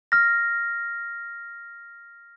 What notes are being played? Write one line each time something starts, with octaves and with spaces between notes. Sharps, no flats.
F6 A#6